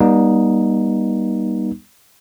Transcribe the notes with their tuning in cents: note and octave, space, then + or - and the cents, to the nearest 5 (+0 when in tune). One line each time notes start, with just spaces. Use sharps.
G3 +0 B3 -45 D#4 +0